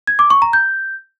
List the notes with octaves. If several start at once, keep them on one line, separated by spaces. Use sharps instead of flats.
G#6
D6
C#6
A#5
G6